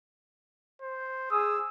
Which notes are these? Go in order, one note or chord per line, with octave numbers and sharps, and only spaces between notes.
C5
G#4 D#6 E6